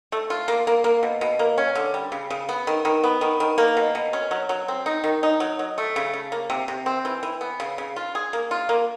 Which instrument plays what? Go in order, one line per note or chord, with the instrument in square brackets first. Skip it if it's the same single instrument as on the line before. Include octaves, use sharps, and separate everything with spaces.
[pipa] A3
F4
A#3
A#3
A#3
B2
B2
A#3
C#4
D3
G3
C#3
C#3
B3
D#3
D#3
B3
D#3
D#3
A#3
B2
B2
C#4
F#3
F#3
C4
D#4
D#3
D#4
F#3
F#3
A3
C#3
C#3
A#3
C3
C3
C4
E3
E3
B3
C#3
C#3
F4
G#4
A#3
F4
A#3